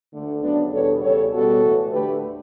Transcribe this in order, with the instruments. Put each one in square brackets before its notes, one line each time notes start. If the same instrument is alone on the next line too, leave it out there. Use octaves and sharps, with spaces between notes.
[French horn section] D2 D3 A3
D2 C#3 F#3 B3 D4
E2 B2 G3 B3 A4 C#5
E2 C#3 G3 A4 C#5
B2 G3 B3 F#4 A4
A2 E3 A3
D2 D3 A3 G4 B4